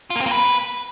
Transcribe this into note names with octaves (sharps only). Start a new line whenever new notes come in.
F4
A#3
C4
A#3
B4